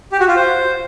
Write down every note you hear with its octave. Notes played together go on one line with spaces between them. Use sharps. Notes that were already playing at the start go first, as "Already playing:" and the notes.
G4
F#4
F4
C5